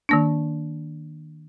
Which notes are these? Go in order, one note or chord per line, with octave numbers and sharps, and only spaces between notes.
D#3 A#3 D4